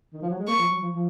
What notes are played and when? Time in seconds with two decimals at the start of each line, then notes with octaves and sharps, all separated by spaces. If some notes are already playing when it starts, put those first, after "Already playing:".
0.13 D#3
0.22 F3
0.30 F#3
0.39 G#3
0.47 A#3 C#6
0.59 F3
0.71 F#3
0.82 F3
0.94 F3